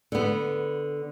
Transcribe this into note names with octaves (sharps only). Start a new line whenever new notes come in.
D3 B3